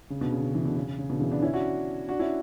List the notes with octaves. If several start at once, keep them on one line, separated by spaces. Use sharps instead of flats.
C#3
B2 D3
C#3
C#3
C#3 E3
B2 D3
C#3
C#3
C#3
B2 D3
C#3 E3
B3 D4
C#4 E4
D4 F#4
D4 F#4
C#4 E4